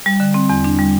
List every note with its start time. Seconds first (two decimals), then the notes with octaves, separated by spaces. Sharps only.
0.06 G3
0.20 D3
0.34 C4
0.49 E2
0.64 D4
0.79 G3